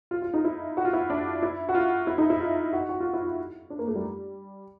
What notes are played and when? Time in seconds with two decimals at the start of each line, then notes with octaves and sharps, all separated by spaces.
0.11 F4
0.22 F4
0.34 D#4
0.45 E4
0.77 F#4
0.85 F4
0.93 E4
1.10 D4
1.43 E4
1.69 F#4
1.75 F4
2.07 E4
2.18 D#4
2.30 E4
2.40 F4
2.73 F#4
2.89 F#4
3.00 F4
3.13 E4
3.25 F4
3.70 D4
3.79 A#3
3.88 A3
3.95 G3